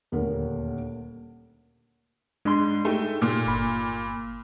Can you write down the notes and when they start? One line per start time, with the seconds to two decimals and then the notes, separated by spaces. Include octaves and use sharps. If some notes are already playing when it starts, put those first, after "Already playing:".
0.12 D#1 D2 A#4
2.45 G#2 G#3 D4 C6
2.85 A3 D#4 G4 G#4
3.22 A#2
3.47 G1 B5